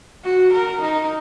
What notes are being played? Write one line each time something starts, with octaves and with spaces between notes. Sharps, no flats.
F#4
A#4
D#4